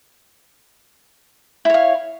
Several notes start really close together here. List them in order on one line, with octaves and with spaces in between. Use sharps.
E4 C#5 F5